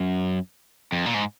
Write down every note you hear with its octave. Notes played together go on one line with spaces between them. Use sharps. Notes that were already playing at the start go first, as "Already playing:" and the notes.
Already playing: F#2
F2
A#2
G#2